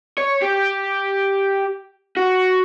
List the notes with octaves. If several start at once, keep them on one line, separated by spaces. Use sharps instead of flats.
C#5
G4
F#4